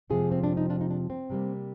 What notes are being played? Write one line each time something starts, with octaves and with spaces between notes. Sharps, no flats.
F2 C3 F3 G#3 F4 G#4
C4
D4
D#4
D4 F4
D#4
D4
C4
C3 G3 A#3